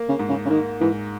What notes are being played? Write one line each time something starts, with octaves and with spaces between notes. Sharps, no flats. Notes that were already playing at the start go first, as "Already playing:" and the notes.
Already playing: A#3
C#3
G#2
C#3
C#3
D#3 A#3
G#2 E3